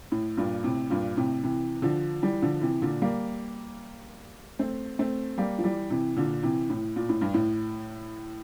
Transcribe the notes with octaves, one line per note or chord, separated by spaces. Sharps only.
A2
G2 A#2
A2 C3
G2 A#2
A2 C3
C3 E3
D3 F3
E3 G3
D3 F3
C3 E3
A#2 D3
G3 A#3
A3 C4
A3 C4
G3 A#3
F3
E3 G3
C3 E3
A#2 D3
C3 E3
A2
A#2
A2
G2
A2